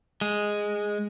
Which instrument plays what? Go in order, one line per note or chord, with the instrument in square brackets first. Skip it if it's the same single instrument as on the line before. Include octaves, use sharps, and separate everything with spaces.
[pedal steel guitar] G#3